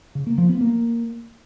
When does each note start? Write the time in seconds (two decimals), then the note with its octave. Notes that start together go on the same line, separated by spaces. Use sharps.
0.15 C#3
0.26 A#3
0.38 F3
0.49 B3
0.61 A#3